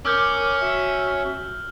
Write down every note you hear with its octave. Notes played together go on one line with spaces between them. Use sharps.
C#4 A#4 D6 E6 F6 G6
F#4 E5